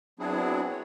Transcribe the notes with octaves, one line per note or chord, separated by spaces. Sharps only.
F#3 B3 C4 D4 E4 G#4
C#5